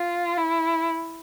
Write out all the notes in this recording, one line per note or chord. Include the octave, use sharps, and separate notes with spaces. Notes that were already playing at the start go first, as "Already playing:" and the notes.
Already playing: F4
E4